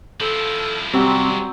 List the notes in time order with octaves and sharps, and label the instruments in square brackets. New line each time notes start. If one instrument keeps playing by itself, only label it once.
[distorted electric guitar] F3 E4 [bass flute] A4
[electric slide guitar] C3 [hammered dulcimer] F#3 C4 [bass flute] G3